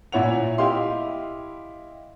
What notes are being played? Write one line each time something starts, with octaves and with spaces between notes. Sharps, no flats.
A#2 E4 C#5 F#5 F7
E4 G4 D#5 F5 C6